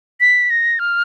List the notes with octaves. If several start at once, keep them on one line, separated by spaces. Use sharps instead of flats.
B6
A#6
F6